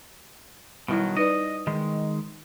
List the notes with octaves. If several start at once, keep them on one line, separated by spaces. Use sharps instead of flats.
B2 D#3 F#3 G3 E4
D#4 B4 D5 D#5
D#3 G#3